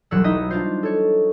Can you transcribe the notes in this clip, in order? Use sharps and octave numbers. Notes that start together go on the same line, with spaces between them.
E1 B1 F#3 G3 F#5 E6
D#4 E4 D#5 E5
D4 F4 C5
A4 C#5